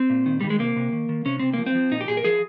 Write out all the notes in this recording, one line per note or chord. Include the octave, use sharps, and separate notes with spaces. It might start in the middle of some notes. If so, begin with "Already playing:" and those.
Already playing: C4
A#2
D#3
D#3 G3
G#3
C3 A#3
C3
D#3
D#3
C3 C#4
C3 C4
F3 A#3
C4
F3
A#2 D#4
G4
A#2 G#4
A#4
F3 G#4